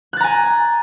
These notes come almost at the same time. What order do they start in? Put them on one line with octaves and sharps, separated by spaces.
F#6 A6 A#5 G#5